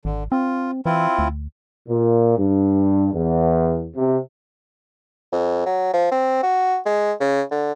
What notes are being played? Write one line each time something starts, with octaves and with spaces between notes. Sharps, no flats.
G#1 D3
C4 F4
E3 C4 E4 F4
D2
A#2
G2
E2
C3
F2
F#3
F3
C4
F#4
G#3
C#3
D3